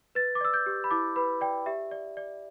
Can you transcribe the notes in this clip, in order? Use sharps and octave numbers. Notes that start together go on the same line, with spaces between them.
B4 A6
D6
D5 E6
G6
G4
B5
E4 D6
B4 B5
D5 G5
G4 E5
D5
D5